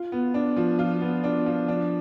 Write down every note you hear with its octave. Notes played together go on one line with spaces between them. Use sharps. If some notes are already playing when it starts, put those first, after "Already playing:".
Already playing: F4
B3
D4
F3
F4
B3
D4
F3
D4